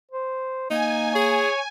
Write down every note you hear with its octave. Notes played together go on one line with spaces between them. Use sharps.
C5
A#3 D#4 G#5
G#4 C#5